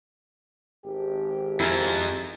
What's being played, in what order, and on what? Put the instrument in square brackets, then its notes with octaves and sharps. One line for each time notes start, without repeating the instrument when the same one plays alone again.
[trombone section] G#1 G4
[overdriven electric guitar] F2 F3 [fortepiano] E4 A#4 G#5